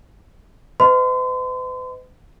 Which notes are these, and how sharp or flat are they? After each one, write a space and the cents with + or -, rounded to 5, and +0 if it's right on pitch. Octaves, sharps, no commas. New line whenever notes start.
B4 +45 D#5 +0 C6 -40